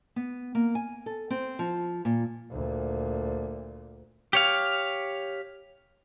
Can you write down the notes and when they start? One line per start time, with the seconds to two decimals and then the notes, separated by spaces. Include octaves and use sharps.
0.16 B3
0.55 A#3
0.75 G#5
1.06 A4
1.30 C4
1.59 F3
2.05 A#2
2.50 D2 A#2
4.33 G4 C#5 F5